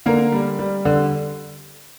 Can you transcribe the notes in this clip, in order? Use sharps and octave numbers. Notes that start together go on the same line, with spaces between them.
D3 A#3 A#4
G3
G3
D3